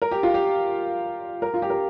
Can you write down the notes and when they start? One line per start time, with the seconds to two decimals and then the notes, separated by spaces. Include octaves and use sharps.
0.02 A#4
0.11 G4
0.23 F4
0.34 G4
1.42 A#4
1.54 F4
1.62 G4
1.70 A#4